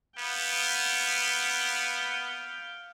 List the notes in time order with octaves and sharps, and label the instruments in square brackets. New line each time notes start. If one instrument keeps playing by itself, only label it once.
[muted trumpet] B3 [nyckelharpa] F5 G5